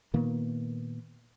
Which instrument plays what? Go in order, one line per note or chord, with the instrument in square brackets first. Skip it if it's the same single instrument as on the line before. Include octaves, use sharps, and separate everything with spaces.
[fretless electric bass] A#2 D#3 A#3 B3